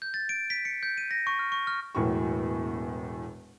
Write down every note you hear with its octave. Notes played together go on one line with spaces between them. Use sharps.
G6
A6
D7
B6
C#7
G6
D#7
A#6
C#6
F6
C#6
F6
E1 E2 A2 F#3 G5 C#6